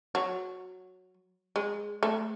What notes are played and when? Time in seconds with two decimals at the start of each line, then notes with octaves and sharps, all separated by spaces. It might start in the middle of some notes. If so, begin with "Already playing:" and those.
0.15 F#3
1.56 G#3
2.03 A3